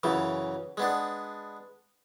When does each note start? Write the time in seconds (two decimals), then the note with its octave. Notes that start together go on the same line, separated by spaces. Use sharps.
0.03 F#2 C#3 E3
0.77 G#3 B3 D4